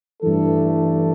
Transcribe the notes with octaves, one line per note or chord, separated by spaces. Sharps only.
G2 E3 A3 D4 A4